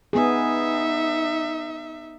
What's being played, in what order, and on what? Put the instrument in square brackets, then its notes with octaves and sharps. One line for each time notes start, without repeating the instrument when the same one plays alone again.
[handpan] B3 G#4 [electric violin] D#4 E5